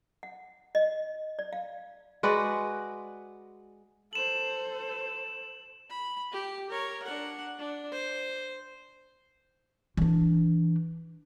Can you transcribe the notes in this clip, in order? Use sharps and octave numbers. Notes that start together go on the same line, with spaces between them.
F#5
D#5
D5
F5
G#3 F#4 B4 D5
A4 C5 E7 F#7
B5
G4
A#4 C#5
D4 F#5
D4
C5
E3 D4